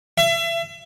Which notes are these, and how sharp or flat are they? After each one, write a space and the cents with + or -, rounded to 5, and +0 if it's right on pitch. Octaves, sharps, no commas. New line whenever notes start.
E5 +30